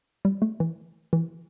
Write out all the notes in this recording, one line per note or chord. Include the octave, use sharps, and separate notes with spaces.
G3
A3
E3
E3